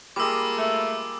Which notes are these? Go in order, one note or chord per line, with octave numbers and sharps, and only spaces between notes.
G3 G#3 A#3 F4 D6 E6
A3